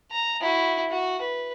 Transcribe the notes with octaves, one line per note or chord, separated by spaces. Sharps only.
A#5
E4 F#4
F#4
B4